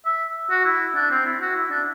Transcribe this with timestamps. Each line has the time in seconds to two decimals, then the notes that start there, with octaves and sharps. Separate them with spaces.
0.05 E5
0.51 F#4
0.65 E4
0.96 D4
1.11 C4
1.26 E4
1.41 F#4
1.56 E4
1.71 D4